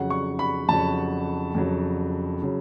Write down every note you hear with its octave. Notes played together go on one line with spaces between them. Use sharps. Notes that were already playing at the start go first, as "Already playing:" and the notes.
Already playing: F2 C#3 F#3 F#5
C#6
B5
F2 C#3 F#3 A5
F2 C#3 F#3
C#3 F#3